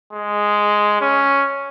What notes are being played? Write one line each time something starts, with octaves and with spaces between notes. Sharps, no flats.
G#3
C#4